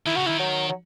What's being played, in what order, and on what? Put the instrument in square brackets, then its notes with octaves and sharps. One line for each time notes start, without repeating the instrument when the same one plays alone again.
[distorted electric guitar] D#3 [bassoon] E4
[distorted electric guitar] C#3 [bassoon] F#4
[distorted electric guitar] D#3 [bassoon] E4
[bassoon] F#3
F#3